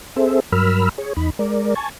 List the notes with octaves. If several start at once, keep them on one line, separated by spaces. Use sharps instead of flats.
C4 G#4 A4 C5 E5
G2 F#3 A#4 B5 E6 F6
G#4 C#5
E2 D#4 B5
G#3 A#4 D5
G#5 A5 C#6